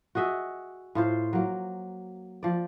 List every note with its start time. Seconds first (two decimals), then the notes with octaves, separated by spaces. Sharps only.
0.15 F#4 G#4 D#5 E5
0.95 A2 F4 C5
1.33 F#3 A#3
2.43 F3 D5